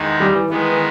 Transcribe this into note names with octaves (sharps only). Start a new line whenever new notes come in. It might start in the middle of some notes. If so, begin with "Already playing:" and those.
Already playing: E2 D#3 G#3 D#4
G3
E3
D#3 E3 G#3 B3
E3